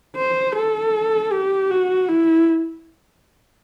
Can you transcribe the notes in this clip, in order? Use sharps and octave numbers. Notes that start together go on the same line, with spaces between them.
C5
A4
G4
F#4
E4